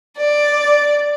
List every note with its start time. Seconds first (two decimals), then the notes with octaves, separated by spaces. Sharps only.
0.17 D5